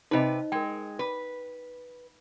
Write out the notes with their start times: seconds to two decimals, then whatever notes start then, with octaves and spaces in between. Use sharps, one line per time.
0.11 C3 D#4 B4 C5 D#5
0.52 G#3 A#4 G5
0.99 B4